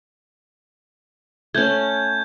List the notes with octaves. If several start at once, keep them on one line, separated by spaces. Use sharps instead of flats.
A3 C#4 G6 G#6